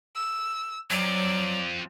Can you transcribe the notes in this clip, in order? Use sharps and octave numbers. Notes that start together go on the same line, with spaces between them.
E6
F3 F#3 C4 D5